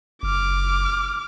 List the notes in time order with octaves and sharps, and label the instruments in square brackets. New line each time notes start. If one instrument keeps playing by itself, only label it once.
[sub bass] F#1 [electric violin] D6 F6